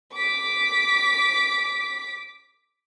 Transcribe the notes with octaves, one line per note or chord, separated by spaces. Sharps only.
D6 B6